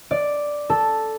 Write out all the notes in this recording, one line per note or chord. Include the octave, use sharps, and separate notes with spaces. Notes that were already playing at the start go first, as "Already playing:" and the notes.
D5
A4